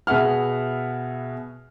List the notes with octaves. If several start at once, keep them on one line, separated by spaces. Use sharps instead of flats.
B2 G#4 E5 F#5 F6